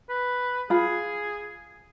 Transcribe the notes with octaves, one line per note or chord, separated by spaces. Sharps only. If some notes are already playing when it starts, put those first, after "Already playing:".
B4
F4 G#4 B5